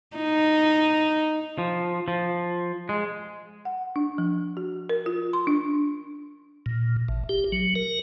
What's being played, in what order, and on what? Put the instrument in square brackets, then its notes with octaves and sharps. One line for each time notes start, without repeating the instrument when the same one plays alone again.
[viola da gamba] D#4
[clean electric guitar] F3
F3
G#3
[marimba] F#5
D4
F3
F#4
A#4
F4
C6
D4
[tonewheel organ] A#2
A1
G4
F#3
A#4